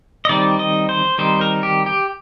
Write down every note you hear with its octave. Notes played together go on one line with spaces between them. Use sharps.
D#5
D#3 G3 C4 D#4 D5
D#5
C5
D#3 G3 C4 D#4 C5
A#4
G4
G4